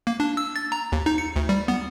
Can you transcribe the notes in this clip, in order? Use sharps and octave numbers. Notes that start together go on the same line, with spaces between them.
A#3
D4
E6
A6
A#5
D#2
D#4
C#7
D2
G3
B3